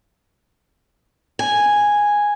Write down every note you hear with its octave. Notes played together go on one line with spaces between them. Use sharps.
G#5